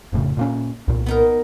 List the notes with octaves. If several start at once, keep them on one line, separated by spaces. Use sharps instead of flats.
F1 A2 C#3
A#2 A#3 C#4
C2 A#2
B3 D#4 A#4